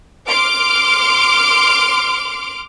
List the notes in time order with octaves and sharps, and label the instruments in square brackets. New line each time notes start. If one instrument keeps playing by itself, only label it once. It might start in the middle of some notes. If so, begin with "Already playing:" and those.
[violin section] C6 D6 F6 D7